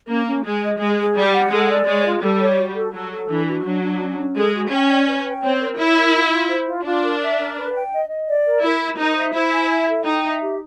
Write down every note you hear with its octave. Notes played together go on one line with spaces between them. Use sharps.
A#3 C#4
C#4
G#3 G#4
D#5
G#3 G#4
G#4
G3 D5
F#5
G#3 A4
D5
G#3 C#5
F4
G3 A4
C#5
F#4
A4
F#3 A4
A4
E3 D4
F#4
F#3 D4
D4
C#4
C#4
G#3 A4
F#4
C#4 G5
D5
B4
G5
C4 C#5
A#4
E4 C#5
A#4
F4
F4
C5
F4
D4 F4
A#4
E5
A#4
B4
G5
D#5
D#5
D5
A#4
E4 A#4
A#4
D#4 C5
E5
E4 C5
G#5
E5
A4
D#4 G5
E5
G4